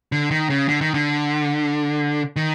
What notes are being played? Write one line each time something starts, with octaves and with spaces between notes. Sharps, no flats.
D3
D#3
C#3
D3
D#3
D3
D#3